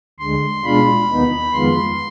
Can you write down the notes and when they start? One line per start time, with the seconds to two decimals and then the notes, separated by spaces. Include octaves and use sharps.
0.19 D2 D3 G#3 C6
0.63 B2 G#3 D4 F4 B5
1.08 D#2 D#3 B3 D#4
1.53 F2 D#3 G#3 B3 F4 C6